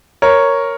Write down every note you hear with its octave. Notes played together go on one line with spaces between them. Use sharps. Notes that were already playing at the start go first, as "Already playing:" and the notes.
A#4 C#5